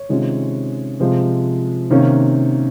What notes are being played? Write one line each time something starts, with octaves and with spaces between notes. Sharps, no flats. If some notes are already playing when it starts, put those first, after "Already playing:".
Already playing: C#5
C3 D#3 G#3 C#4 F4
C3 F3 G#3
C3 D#3 A#3 C#4